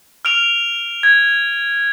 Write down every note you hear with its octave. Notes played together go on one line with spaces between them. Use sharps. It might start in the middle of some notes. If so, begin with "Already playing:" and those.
F6 D7 F7
G#6